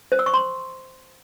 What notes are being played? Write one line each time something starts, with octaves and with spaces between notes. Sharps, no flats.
C5
E6
C#6
C6